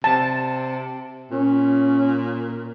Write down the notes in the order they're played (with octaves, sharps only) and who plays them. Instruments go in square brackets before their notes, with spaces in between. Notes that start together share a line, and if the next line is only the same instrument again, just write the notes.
[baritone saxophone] C3 [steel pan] A5
[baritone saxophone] A#2 [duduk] C#4